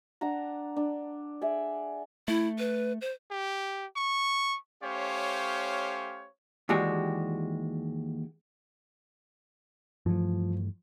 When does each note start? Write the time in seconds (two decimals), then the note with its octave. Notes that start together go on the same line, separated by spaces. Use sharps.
0.21 D4 F#5 A5 A#5
0.76 D4
1.41 G#4 D5 E5
2.28 A3 E4
2.59 B4
3.01 C5
3.31 G4
3.96 C#6
4.83 A3 C#4 G4 C5 C#5 F5
6.69 D#2 E3 G#3 F#4 G4 D5
10.06 G2 E3 F3 A3